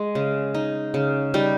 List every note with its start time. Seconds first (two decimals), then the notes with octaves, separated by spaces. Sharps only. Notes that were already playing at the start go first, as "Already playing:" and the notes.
Already playing: G#3
0.15 C#3
0.55 D#4
0.94 C#3
1.34 G3 D#4